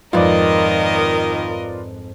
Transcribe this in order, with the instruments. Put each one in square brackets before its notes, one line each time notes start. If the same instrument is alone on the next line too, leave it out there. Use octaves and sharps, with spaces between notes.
[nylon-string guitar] F2 G#2 [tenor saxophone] D#3 [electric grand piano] F4 B4 D5 [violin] A#4 D#5